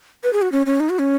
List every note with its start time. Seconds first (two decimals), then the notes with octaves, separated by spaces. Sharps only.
0.24 B4
0.33 G#4
0.42 F#4
0.52 C#4
0.66 C#4
0.80 D#4
0.90 F#4
0.99 C#4